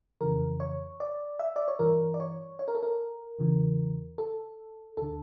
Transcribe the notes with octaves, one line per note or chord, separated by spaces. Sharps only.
F2 C#3 E3 A#4
C#5
D5
E5
D5
C#5
G2 E3 A#4
D5
C#5
C#5
A#4
A4
A#4
E2 C#3 E3
A4
D2 D3 A4